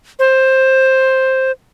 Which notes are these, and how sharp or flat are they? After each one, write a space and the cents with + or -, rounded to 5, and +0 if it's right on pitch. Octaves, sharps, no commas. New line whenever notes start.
C5 +10